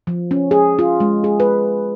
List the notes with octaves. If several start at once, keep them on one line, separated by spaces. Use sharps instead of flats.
F3
C#4
G#4
F4
G#3
G#4
B4